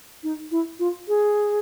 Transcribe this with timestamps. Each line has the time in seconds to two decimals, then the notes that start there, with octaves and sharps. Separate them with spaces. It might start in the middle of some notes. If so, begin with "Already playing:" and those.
0.24 D#4
0.52 E4
0.79 F4
1.08 G#4